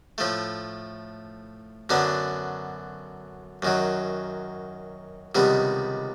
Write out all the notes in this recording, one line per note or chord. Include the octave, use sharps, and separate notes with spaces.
A2 F3 A3
F#2 D3 F#3 B3 D4
F#2 D#3 F#3
C#2 C3 D#3 G3 B3